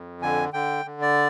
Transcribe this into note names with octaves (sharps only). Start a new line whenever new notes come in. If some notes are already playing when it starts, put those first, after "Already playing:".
Already playing: F2
D3 G#5
D3 G5
D3
D5